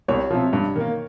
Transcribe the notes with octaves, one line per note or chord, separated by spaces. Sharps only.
C2 C#5
C3 F3
G2
D#3 A#3